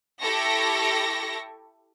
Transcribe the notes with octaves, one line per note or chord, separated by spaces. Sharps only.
E4 G4 A4 C#6 A#6